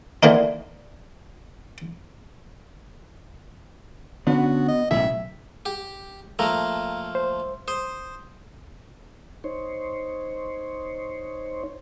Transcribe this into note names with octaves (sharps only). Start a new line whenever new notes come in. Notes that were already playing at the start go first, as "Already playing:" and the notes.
D3 E3 A#3 D#4
D3 B3 C#4 F#4
D#5
B1 A2 C#3 E5
G4
F3 A3 A#3 F5 A#5 F6
C5
C5 D#6
D#4 C5 C#5